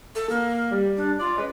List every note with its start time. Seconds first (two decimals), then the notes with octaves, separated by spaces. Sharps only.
0.15 A4
0.30 A#3
0.72 G3
0.97 D4
1.19 F4 D5
1.37 G#3 C#4 B4